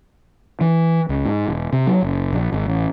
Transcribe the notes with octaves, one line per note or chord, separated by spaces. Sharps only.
E3
C#2
G#2
E1
C3
F#3
F#1
A#1
G#1
A1